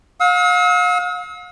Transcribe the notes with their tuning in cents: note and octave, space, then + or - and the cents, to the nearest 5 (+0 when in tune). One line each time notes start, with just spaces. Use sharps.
F5 +40 E6 -45